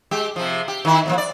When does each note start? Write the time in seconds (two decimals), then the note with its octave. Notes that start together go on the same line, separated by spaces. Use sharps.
0.11 G#3 G4
0.36 C3 F3
0.68 G4
0.85 D#3 E4
1.06 F2 A#2 F3
1.18 D5